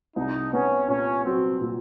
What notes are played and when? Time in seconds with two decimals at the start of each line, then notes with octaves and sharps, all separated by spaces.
0.16 C2 D#4
0.53 B3 C#4
0.88 A#2 C#4
1.25 F#3 C4
1.61 A#2